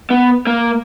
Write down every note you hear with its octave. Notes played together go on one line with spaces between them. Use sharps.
B3
A#3